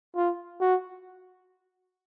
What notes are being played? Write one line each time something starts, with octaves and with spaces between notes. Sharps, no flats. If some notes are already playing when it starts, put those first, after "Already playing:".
F4
F#4